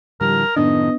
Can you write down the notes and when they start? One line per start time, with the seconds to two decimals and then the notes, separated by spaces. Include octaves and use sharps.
0.21 A2 D3 F3 G3 A#4
0.57 F#2 A2 D#3 B3 D4 D#5